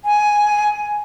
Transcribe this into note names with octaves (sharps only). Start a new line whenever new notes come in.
G#5